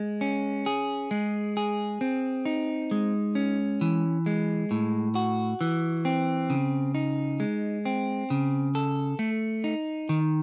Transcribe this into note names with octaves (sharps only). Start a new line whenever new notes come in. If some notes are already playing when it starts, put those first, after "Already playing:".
Already playing: G#3
C#4
G#4
G#3
G#4
C4
D#4
G#3
C#4
E3
G#3
A2
F#4
E3
C4
C#3
D#4
G#3
C4
C#3
A4
A3
D#4
D#3